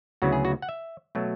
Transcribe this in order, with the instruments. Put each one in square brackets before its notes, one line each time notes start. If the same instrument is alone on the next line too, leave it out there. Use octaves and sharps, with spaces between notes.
[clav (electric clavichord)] D2 C#3 F#3 B3 E4 F#4
G#4
F#4
F#5
E5
B2 F#3 A3